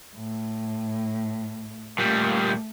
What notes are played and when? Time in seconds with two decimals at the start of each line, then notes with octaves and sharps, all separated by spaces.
0.16 A2
1.99 A#2 G3 A3